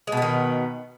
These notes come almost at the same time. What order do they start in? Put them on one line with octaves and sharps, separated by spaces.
G#3 B2 B3 D#3